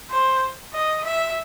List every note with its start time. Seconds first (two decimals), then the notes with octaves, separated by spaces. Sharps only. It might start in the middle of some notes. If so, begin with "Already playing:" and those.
0.10 C5
0.74 D#5
1.04 E5